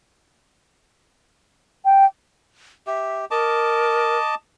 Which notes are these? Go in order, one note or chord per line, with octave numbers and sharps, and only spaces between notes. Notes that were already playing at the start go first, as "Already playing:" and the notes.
G5
G4 E5
A#4 D#5 A5 D6